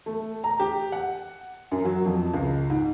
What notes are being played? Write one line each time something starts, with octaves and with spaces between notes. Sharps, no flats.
A3
A#5
G4
F#5
F#2
F#3
F2
C#2
G#2